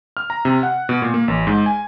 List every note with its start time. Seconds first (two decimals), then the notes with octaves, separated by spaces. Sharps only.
0.17 F6
0.30 A#5
0.45 C3
0.63 F#5
0.89 B2
1.02 A#2
1.14 A#3
1.28 A1
1.47 G#2
1.66 G#5